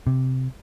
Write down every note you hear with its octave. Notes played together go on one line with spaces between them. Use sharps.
C3